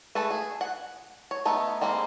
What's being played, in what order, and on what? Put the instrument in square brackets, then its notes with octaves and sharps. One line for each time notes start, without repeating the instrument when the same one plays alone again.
[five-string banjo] A3 G#4 A4 B4
G#4
F#5
C#5
A3 B3 D#4
G3 G#3 A#3 C4